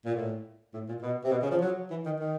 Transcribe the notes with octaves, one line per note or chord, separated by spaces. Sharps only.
A#2
A2
A2
A#2
B2
C3
B2
C#3
F3
F#3
E3
D#3
D#3